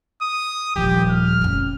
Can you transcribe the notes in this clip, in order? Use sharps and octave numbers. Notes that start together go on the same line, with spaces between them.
D#6
D#1 F3 G4
F6
F1 C#4